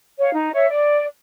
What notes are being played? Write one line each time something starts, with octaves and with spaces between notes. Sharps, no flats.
C#5 F5
D#4
C#5 E5
D5